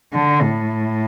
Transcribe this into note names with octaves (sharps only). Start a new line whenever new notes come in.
D3
A2